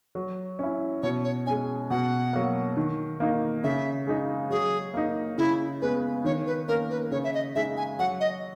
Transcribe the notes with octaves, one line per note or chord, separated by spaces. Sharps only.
F#3
C#4 E4
B2 C#5
C#5
G#3 C#4 G#5
B2 F#5
F#3 A#3
D#3
A#3 D#4
C#3 E5
G#3 D#4
F#3 G#4
A#3 D#4
C#3 E4
G#3 B3 B4
D#3 C#5
B4
A#3 C#4 A#4
B4
C#3 C#5
E5
D#5
G#3 D#4 E5
G#5
F#3 F#5
D#5